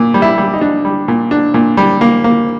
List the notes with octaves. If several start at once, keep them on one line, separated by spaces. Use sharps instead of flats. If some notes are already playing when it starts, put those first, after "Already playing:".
Already playing: A#2
G3
E4
G3
D#4
D4
G3
A#2
D4
A#2
G3
A#3
A#3